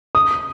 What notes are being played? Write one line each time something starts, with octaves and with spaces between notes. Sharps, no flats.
D#6